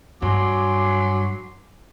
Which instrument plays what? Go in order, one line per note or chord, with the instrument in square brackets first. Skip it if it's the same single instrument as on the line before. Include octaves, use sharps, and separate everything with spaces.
[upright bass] G2 [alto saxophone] F#3 [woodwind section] G#5 C6 D6